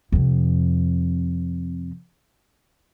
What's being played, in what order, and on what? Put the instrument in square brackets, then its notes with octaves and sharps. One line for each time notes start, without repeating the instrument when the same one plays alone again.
[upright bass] F2 C3